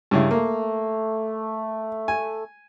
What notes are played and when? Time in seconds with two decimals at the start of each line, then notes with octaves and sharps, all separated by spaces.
0.11 G2 C#3 E4
0.31 A3 A#3
2.08 G#5